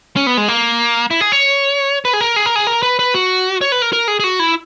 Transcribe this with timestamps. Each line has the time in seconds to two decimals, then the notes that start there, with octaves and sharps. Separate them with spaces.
0.16 C#4
0.27 B3
0.37 G#3
0.48 A#3
1.11 E4
1.21 G#4
1.32 C#5
2.05 B4
2.13 G#4
2.21 A#4
2.36 G#4
2.46 A#4
2.56 G#4
2.67 A#4
2.83 B4
2.99 B4
3.14 F#4
3.61 C#5
3.72 B4
3.82 A#4
3.93 A#4
4.08 G#4
4.20 G#4
4.24 F#4
4.40 E4